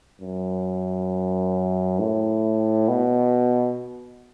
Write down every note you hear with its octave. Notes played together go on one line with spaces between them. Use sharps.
F#2
A2
B2